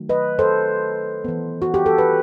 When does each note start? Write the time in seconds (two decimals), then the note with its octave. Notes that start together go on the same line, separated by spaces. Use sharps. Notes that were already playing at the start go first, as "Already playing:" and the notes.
Already playing: D#3 F#3 A3
0.09 B4 D#5
0.39 A4 C5
1.24 E3 B3
1.62 F#4
1.74 G4
1.86 A4
1.98 B4